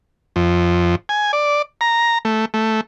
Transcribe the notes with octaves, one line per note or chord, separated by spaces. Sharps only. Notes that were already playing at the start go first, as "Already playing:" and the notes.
F2
G#5
D5
A#5
A3
A3